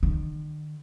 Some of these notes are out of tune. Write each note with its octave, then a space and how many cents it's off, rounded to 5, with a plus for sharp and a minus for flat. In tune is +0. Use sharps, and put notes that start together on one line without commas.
D#3 -45